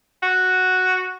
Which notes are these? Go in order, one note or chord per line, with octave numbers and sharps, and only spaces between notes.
F#4